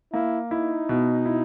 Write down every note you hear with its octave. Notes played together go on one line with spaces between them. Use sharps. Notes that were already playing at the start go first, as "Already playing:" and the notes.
A#3 E4
D#4 E4
B2
E4